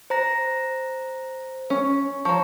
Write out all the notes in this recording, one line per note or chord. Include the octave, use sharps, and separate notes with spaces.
C5 A#5 A#6
C#4
F3 C#5 A#5 C#6